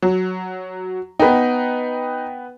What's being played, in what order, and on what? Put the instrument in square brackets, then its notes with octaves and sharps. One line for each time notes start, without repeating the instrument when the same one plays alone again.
[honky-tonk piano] F#3
[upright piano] B3 B4 G5 [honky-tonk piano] D#4